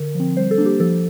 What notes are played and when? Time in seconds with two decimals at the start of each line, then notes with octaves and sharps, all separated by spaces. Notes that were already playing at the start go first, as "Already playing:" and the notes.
Already playing: D3 A#4
0.15 F3 C4
0.37 G3 C5
0.51 A4
0.58 A#3 D4
0.66 G4
0.80 F3 A4